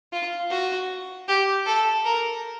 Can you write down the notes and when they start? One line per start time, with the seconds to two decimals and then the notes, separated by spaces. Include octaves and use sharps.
0.13 F4
0.51 F#4
1.28 G4
1.66 A4
2.05 A#4